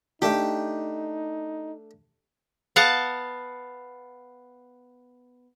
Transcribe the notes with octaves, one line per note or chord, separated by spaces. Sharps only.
A3 D4 D#4 G4
B3 F5 F#5 A5